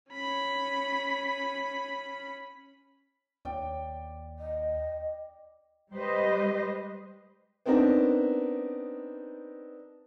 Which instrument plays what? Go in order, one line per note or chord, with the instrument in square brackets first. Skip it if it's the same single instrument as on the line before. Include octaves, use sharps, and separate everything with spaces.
[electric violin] C#4 B5
[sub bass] D#2 [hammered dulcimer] D5 G5
[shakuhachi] D#5
[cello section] G3 G#3 G4 B4 C5 D#5
[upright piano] B3 C4 D4 D#4 A#4